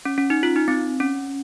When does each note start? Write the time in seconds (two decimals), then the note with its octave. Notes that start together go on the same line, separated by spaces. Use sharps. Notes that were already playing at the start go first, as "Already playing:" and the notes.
0.05 C#4
0.18 C#4
0.30 D#4
0.43 F4
0.56 D#4
0.68 C4
1.00 C#4